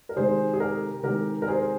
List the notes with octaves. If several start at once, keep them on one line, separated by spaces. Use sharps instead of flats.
A#4
C3 D#3 G#3 G#4 C5
G#4
G4 A#4
C3 D#3 G#3 G4 A#4
A#4
G#4 C5